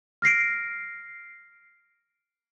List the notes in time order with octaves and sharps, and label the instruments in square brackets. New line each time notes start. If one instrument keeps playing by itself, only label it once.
[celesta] F6 A#6 C7 D7